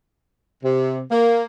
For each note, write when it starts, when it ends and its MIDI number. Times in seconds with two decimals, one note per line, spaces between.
0.63 1.00 48
1.10 1.45 58